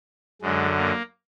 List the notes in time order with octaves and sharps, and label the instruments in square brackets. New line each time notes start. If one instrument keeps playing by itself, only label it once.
[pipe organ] F#2 D3 G#3
A#3